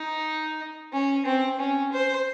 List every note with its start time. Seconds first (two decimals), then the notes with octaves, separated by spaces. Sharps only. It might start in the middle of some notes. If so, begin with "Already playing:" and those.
Already playing: D#4
0.93 C#4
1.25 C4
1.59 C#4
1.93 C5